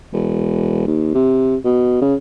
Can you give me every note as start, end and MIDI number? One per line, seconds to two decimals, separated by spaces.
0.13 0.84 28
0.87 1.13 39
1.14 1.56 48
1.65 1.97 47
2.01 2.15 49